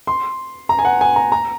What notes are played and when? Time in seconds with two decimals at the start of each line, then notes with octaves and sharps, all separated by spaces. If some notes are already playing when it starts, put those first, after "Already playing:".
0.07 C6
0.69 A#5
0.79 G#5
0.85 F#5
1.01 G#5
1.16 A#5
1.32 A#5